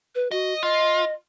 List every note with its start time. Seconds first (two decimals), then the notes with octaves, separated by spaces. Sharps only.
0.15 B4
0.31 F#4 D#5
0.63 F4 D#5